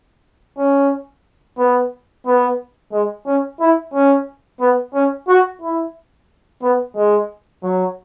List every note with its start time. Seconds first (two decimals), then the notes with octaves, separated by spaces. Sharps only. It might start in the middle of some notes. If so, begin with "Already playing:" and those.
0.58 C#4
1.58 B3
2.26 B3
2.92 G#3
3.26 C#4
3.60 E4
3.94 C#4
4.60 B3
4.94 C#4
5.28 F#4
5.61 E4
6.62 B3
6.96 G#3
7.63 F#3